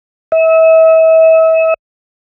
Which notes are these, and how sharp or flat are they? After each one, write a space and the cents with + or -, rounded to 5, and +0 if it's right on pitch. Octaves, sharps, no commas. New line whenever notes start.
E5 -35